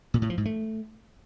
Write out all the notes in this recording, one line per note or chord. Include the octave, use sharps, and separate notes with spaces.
A#2
A2
F3
G#2
A3